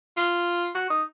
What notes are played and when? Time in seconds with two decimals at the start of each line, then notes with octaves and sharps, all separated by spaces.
0.17 F4
0.75 F#4
0.90 D#4